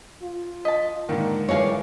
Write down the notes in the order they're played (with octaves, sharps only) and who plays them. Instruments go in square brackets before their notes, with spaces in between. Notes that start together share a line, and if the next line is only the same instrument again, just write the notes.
[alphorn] F4
[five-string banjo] D#5 A5 [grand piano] B6
[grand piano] G#2 D3 D#3 [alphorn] A#3
[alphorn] E3 [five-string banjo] A#3 D4 F5 [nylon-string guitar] F4 G#4 C#5